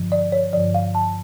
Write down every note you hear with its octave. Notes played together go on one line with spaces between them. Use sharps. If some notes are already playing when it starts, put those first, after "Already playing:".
Already playing: G2 D3 F3
D5
C#5
G2 D3 F3 D5
F5
A5